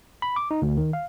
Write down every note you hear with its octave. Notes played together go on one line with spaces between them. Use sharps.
B5
D6
D#4
D2
D#3
F5